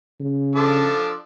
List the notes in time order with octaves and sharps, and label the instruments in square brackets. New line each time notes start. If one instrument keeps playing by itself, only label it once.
[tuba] C#3
[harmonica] F3 D4 A4